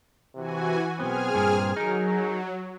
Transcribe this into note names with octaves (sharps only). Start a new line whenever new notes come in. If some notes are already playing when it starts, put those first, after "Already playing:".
C3 E3 F#4 G#5
B1 B3 C4 G#4 G#5 F6
G2 A#2
F#3 D#4 G#4 A#4